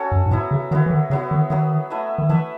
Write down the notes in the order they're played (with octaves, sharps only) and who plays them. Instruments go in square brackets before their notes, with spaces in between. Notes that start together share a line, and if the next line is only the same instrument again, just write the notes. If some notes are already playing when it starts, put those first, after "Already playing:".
Already playing: [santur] C#4 F#4 A4 C#5
[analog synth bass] F#2
G#2
[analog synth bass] A2 [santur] F#3 B3 E4
[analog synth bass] C#3
[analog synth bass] D#3 [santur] F#3 B3 E4
[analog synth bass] E3
D#3
[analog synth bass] C#3 [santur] F#3 B3 E4
[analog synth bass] D#3
[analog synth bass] D#3 [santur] F#3 B3 E4
[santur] A3 E4 B4 E5
[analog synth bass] D#3
[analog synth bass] E3 [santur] A3 E4 B4 E5